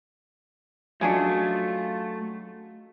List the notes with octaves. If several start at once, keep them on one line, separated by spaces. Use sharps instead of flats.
F#3 G#3 A3 C#4 D4 F4